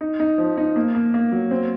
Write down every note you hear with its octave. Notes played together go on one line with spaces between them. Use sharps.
D#4
D#4
F3
D#4
A#3
A#3
A#3
F#3
C4